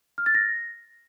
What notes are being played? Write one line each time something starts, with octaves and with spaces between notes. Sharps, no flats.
F6
A6
A#6